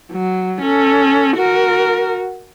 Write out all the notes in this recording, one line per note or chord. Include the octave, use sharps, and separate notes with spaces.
F#3
C#4 A4
F#4 A#4